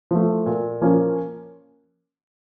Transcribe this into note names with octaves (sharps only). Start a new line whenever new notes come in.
F3 A3
A#2
F3 A#3 C#4